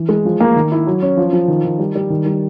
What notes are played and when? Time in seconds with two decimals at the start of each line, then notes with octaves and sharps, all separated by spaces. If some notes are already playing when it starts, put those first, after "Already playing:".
Already playing: E3
0.09 G#3
0.25 F3
0.41 A#3
0.56 D#3
0.72 E4
0.87 F#3
1.02 C#4
1.17 F3
1.33 F3
1.48 D#3
1.65 D#3
1.79 G3
1.96 G3
2.10 D#3
2.26 G3